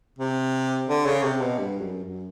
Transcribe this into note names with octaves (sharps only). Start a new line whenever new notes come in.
C3
D3
C#3
C3
B2
G2
F#2
F#2